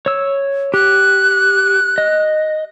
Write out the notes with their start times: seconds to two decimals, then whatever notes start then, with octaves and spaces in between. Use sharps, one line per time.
0.06 C#5 E6
0.74 G4 F#6
1.98 D#5